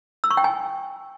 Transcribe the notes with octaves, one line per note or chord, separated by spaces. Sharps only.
E6
C#6
G5
G#5